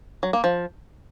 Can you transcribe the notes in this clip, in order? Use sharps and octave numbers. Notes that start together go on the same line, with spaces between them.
F#3
A#3
F3